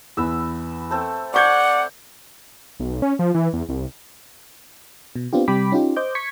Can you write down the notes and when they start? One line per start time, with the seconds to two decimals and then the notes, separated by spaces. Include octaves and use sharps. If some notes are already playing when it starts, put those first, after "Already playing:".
0.17 E2 B3 E5 E6
0.90 A3 C4 A4
1.34 D5 F#5 C#6 G6 G#6
2.80 B1
3.02 C#4
3.19 F3
3.35 E3
3.53 E2
3.69 C2
5.16 B2
5.33 B3 C4 D4 F4 G4
5.48 C3 G3 G5 B5 D6 B6
5.72 C#4 D#4 F4 G4
5.96 C5 D#5 D6 G6
6.15 C#6 G#6 B6 C#7